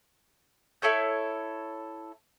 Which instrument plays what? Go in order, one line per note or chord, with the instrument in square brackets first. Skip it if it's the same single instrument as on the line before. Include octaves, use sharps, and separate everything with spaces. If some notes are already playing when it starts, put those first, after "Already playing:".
[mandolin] E4 A4 C#5 G6